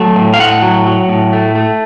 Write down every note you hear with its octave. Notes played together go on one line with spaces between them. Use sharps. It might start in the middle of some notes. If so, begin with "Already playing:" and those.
Already playing: F#3 A3
A2
F5
A2 F#5
F#3
F#3
A2
A3
A3